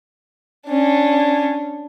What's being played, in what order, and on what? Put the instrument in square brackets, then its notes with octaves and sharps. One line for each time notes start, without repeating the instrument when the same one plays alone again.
[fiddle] C#4 D4